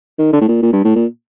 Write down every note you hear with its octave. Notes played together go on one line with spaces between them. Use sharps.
D#3
D3
A2
A#2
A#2
G2
A2
A#2